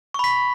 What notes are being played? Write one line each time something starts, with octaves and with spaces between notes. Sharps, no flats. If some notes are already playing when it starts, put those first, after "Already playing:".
B5 C#6 B6